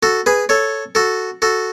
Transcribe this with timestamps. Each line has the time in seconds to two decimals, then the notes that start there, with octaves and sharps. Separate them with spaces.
0.03 F#4 A4
0.26 G#4 B4
0.49 A4 C#5
0.95 F#4 A4
1.42 F#4 A4